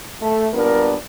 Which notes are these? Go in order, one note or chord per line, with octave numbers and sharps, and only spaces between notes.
A3
A#2 G3 B3 D4 A#4